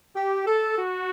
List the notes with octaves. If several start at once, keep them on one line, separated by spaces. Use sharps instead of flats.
G4
A4
F#4